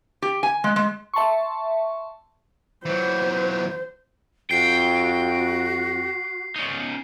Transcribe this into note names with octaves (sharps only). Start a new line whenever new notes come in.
G4
G#5
G#3
G#3
E5 A5 C6 C#6
E3 F#3 C5
F2 F#4 G5 C7
C#4 D#4